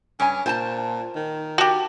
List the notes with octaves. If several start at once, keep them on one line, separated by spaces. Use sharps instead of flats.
G2 C#4 G#5
A#2 C5 G#5 A5
D#3
F#4 G4 A5